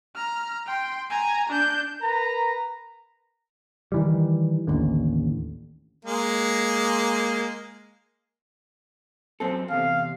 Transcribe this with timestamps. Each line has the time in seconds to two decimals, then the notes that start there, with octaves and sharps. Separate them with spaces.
0.16 A#5 F6
0.67 G5 C6
1.10 G#5 A#5
1.50 D4 G6
2.01 A#4 B4 A#5
3.92 D#3 E3 G3
4.67 A1 D#2 D3
6.05 G#3 A#3
9.40 F#2 C4 A4
9.70 E2 C3 F5